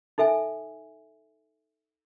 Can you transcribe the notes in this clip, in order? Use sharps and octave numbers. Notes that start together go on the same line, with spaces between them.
D#4 A4 E5 G#5